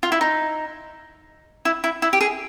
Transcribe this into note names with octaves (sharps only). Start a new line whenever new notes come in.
F4
E4
D#4
E4
E4
E4
G4
G#4